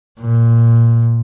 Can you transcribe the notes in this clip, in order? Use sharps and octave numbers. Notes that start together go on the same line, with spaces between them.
A#2